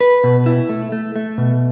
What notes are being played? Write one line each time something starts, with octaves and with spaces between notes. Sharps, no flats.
B4
B2
E4
A3
A3
A3
B2